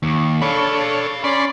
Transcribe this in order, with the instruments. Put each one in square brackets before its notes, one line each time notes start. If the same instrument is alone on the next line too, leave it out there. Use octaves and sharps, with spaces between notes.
[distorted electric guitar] D#2
[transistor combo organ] D4 A4 C#5 [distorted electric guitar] F5 B5
[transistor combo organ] C#4 B5 C6 [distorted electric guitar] D5